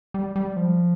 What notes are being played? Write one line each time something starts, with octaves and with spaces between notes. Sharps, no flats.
G3
G3
F3